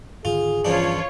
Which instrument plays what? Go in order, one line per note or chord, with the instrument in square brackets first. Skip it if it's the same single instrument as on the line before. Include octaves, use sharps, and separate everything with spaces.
[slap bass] G#2 D3 D#3 [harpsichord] F4 [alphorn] G#4
[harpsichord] E2 F3 D4 [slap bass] G2 E3 C#4 [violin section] F4 C#5